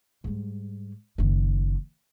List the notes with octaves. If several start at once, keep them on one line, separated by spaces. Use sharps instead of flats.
G#2 G3
F#1 D#3